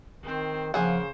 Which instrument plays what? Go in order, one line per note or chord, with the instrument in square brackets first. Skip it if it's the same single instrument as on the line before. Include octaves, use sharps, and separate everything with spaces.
[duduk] D#3 [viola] C4 C5
[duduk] C#3 [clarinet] F3 [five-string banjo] A#3 G#4 F#5 [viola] C5